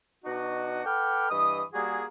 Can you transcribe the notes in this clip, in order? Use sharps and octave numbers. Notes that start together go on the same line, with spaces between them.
B2 D4 D#4 F#4
A4 B4 F#5 G5 D6 F6
G2 E3 D#5 D#6
G3 A#3 F#4 G#4